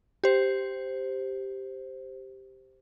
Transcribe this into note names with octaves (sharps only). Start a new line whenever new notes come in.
G4 C5